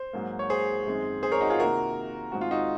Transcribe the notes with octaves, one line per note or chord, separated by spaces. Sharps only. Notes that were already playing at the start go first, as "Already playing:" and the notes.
Already playing: C5
G#2 F#3 A#3
C#5
G#4 C5
F#2 D#3 G#3 C4
G#4 C5
A#4 C#5
D#4 F#4
F4 G#4
C3 D#3 A#3 F#4 A#4
G#2 D#3 G#3 C4 F#4
F4
D#4 F#4